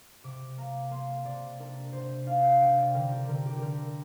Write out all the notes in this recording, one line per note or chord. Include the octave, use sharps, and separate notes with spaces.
C3 D6
A#3 A#5
A#3 C6
C3 D5
D4 A#4
C3 C5
D4 F5
G5
C3 G5
D5
D3 A#4
G4
D3 A#4
G4
G4
D3 A#4